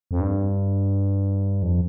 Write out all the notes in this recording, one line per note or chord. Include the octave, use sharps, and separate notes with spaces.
F2
G2
F2